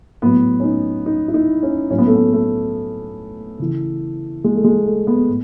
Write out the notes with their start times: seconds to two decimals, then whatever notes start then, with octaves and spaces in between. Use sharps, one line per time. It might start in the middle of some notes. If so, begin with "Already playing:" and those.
0.22 A2 F#3 B3
0.60 C#4
0.64 D#4
1.06 D#4
1.28 E4
1.34 D#4
1.63 C#4
1.90 A2 F#3 C#4
1.98 B3
2.07 A3
2.15 B3
2.33 A3
3.59 C#3 E3
4.44 G#3
4.55 A3
4.64 G#3
4.86 A3
5.07 B3
5.29 A2